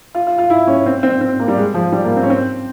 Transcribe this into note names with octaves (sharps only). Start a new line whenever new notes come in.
F4
F4
F4
E4
C#4
C4
C4
C4
A#3
G3
G#3
F3
G3
A#3
C4
C#4
C4